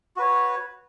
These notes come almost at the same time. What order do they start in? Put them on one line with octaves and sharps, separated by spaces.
F#4 B4 C#5